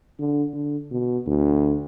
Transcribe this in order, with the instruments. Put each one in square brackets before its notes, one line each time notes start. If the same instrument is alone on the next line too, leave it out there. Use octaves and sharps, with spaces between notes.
[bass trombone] D3
D3
B2
D2